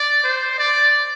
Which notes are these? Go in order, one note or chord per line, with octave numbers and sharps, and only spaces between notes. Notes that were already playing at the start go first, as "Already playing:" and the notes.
Already playing: D5
C5
D5